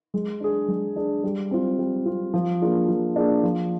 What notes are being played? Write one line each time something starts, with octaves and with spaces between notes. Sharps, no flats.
G#3
D4 G#4
G#3
D4 G#4
G3
C4 F4
G3
C4 F4
F3
A#3 D4 F4 G#4
F3
A#3 D4 F4 G#4
F3